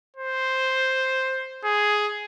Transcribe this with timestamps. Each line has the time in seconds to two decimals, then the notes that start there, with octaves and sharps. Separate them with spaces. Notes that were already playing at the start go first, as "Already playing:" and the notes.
0.16 C5
1.64 G#4